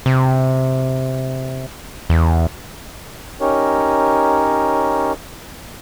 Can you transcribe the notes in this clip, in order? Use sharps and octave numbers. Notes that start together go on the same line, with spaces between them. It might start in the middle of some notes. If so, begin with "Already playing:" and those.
C3
E2
C#4 D#4 G4 A#4 C#5